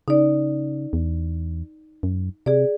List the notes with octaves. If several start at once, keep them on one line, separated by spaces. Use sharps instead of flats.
C#3 D#4 D5
E2
F#2
C3 G#4 D5